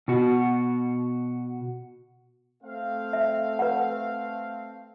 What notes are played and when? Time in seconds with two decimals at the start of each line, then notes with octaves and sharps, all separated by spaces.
0.08 B2 F#4
2.63 A3 C4 F5
3.13 E5
3.59 B4 F#5